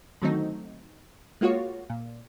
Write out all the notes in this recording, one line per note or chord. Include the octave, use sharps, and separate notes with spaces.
D3 D#3 F#3 A3 C4 D#4
G#3 A#3 F4 F#4 C#5
A#2